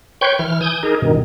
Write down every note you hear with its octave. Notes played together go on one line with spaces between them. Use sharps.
B4 C#5 G5 C6 C#6 G6
E3 F6
G#5 D#6 G6
D#4 G#4 A#4
G2 B2 D#3